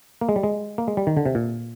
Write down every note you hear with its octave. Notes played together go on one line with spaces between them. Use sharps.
A#3
G#3
G3
G#3
A#3
G#3
G3
D#3
D3
C3
A#2